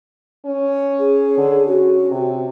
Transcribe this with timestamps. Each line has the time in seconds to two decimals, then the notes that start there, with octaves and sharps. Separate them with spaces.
0.46 C#4
0.99 G#4
1.38 D3
1.67 C#4 F#4
2.11 C3